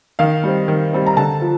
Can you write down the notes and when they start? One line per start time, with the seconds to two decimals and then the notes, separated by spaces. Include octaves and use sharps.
0.19 D#3 F5
0.43 G3 C4
0.68 D#3
0.93 G3 C4
1.07 A#5
1.17 D3 A5
1.41 F3